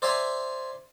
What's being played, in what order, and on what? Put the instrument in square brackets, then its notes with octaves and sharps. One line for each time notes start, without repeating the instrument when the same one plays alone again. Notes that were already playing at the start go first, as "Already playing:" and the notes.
[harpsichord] C5 D5 E5 G#5 A#5 C6